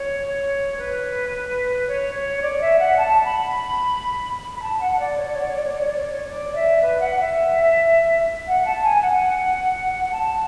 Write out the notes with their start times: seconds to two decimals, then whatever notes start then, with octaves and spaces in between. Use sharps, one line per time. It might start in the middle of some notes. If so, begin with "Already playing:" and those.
Already playing: C#5
0.77 B4
1.87 C#5
2.14 C#5
2.42 D5
2.60 E5
2.78 F#5
2.97 A5
3.25 B5
4.55 B5
4.62 A5
4.80 F#5
4.99 D5
5.17 C#5
5.24 D5
5.32 C#5
5.40 D5
5.48 C#5
5.55 D5
5.64 C#5
5.71 D5
5.79 C#5
5.87 D5
5.95 C#5
6.03 D5
6.11 C#5
6.27 D5
6.54 E5
6.82 B4
7.00 F#5
7.18 E5
8.47 F#5
8.65 A5
8.83 G#5
9.02 F#5
10.11 A5